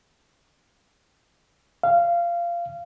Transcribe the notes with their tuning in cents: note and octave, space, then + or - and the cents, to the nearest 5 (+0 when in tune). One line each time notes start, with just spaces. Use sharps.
F5 -20